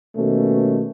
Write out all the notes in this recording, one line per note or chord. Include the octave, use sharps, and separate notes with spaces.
B2 D#3 G3 A3 A#3 C#4